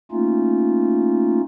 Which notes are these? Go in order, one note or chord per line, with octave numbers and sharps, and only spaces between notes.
A3 A#3 C#4 D#4 F4